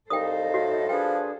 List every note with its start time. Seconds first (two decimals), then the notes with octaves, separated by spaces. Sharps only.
0.10 C2 D#4 A4 C5 D#5 F5 G5 D#6
0.54 A2 F#4
0.89 F3 D4 G#4 B4 G5